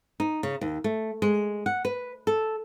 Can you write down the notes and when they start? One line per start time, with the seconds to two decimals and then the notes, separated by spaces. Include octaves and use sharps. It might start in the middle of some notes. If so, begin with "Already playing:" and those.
0.20 D#4
0.43 C#3
0.61 D#2
0.84 A3
1.22 G#3
1.66 F#5
1.85 B4
2.27 A4